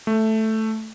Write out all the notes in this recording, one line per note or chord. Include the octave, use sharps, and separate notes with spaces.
A3